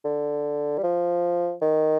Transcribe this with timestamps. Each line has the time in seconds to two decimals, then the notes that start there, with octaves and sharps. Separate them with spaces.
0.05 D3
0.78 G3
0.83 F3
1.62 D#3